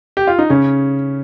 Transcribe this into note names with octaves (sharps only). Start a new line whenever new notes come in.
G4
F4
D#4
C#3 C#4